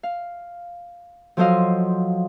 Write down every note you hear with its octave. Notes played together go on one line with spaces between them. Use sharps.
F5
F3 F#3 A4 C5 D#5 F5